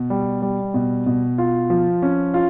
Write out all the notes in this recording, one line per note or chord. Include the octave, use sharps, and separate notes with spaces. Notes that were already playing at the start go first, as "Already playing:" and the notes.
Already playing: B2
G3
G3
B2
B2
F4
F3
C#4
F4